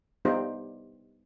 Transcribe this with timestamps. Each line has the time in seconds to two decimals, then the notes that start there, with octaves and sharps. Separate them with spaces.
0.25 G3 B3 D#4 F4 G4 C5